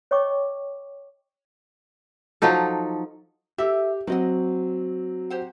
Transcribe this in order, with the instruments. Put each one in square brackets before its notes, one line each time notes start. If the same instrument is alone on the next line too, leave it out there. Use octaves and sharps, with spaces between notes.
[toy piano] C#5 D#5 G5 C#6 D6
[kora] F3 F#3 D#4 A4
[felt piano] G4 [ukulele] A4 E5
[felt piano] F#3 C4 [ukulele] F#4 D#5 F#5
[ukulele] G4 C5 F#5